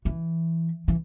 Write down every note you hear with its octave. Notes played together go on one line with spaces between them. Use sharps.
E3
E3